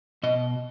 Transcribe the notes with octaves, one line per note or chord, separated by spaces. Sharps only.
B2 D#5